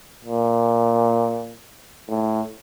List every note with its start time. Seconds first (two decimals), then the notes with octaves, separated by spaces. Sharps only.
0.25 A#2
2.09 A2